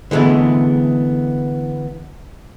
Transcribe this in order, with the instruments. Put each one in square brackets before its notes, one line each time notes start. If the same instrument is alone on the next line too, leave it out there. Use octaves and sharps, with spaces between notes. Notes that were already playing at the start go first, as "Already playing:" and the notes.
[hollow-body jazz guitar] D3 E3 G#3 A3 B3